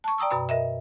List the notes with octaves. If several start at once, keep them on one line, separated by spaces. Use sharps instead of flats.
A5 C#6
D5 G5 A#5 D#6 E6
F#2 B2 A#5 B5
A#4 D#5 E5